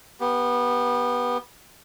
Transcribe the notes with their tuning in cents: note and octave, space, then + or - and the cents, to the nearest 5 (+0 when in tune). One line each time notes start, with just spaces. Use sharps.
B3 -15 G4 +0